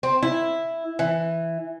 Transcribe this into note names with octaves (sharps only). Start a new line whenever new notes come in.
C4
E4
E3